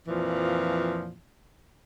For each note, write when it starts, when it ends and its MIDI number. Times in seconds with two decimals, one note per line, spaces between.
0.08 1.15 41
0.08 1.15 46
0.08 1.15 52
0.08 1.15 53